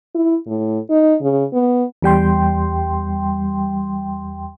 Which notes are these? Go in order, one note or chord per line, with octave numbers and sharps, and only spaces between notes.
E4
A2
D#4
C#3
B3
E2 G3 G5 C6